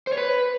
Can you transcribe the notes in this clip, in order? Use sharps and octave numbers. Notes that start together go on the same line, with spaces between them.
C5
C#5
B4